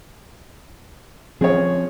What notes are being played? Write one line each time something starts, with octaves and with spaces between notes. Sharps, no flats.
F3 C4 C#4 G#4 C#5